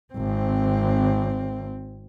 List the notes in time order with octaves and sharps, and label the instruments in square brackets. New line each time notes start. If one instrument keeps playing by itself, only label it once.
[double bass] G#1 C4